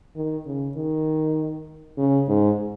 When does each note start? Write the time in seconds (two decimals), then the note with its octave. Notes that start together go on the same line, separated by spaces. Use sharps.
0.16 D#3
0.46 C#3
0.77 D#3
1.98 C#3
2.28 G#2